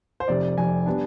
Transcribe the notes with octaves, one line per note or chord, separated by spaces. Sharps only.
C5
F1 F2 C3 D5
F1 F2 C3 G#5
G3 B3 D4